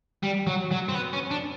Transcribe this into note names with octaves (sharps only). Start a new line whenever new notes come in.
G3
F#3
F#3
C4
B3
C#4
D4